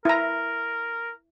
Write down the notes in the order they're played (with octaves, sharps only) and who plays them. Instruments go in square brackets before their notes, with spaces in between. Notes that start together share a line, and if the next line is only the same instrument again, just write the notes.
[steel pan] E4 A#5 [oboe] A#4